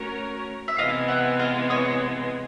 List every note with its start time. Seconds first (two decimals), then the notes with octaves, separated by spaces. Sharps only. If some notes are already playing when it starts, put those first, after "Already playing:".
Already playing: A3 C#4 F#4 A#4 C#5
0.68 E5
0.78 C3 E3 G#3 B3 D#5 F5
1.08 E5 F#5
1.39 D#5 F5
1.70 C#5 D#5